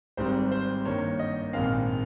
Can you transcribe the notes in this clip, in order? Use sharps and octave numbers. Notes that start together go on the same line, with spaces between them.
G#1 G#2 G3 C4 C5
C5
G2 D#3 A#3 C#5
D#5
A#1 G#2 D#3 G#3 C4 F5